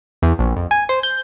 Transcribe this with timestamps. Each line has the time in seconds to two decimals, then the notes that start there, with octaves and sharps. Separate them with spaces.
0.22 E2
0.39 A#1
0.57 F2
0.71 G#5
0.89 C5
1.03 G6